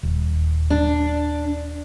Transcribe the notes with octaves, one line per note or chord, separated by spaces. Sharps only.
D#1
D4